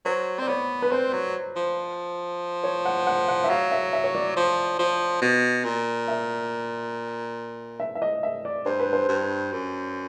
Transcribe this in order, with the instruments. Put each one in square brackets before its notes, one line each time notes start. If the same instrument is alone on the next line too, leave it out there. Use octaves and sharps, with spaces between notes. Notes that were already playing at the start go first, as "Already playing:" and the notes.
[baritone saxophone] F#3 [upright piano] C5
[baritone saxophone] C4 [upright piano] D5
[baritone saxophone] B3 [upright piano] C#5
[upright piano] B4
[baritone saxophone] C4 [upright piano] C5
[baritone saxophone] F#3
F3
[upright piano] C#5
F#5
F#5
F#5
E5
[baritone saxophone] F#3 [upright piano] F5
[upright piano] E5
E5
C#5
D5
[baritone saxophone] F3
F3
B2
A#2
[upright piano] E5
E5
E5
D#5
E5
D5
[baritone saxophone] G2 [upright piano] C5
[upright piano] B4
C5
[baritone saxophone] G2
F#2